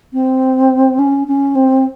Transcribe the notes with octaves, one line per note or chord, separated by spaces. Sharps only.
C4
C#4
C#4
C4